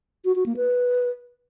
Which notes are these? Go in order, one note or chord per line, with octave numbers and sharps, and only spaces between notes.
F#4
F#4
A#3
B4